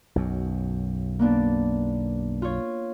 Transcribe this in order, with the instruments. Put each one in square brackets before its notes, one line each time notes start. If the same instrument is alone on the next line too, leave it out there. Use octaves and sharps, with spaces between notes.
[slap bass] B1 F#2
[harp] A#3 B3 D4
F4 C#5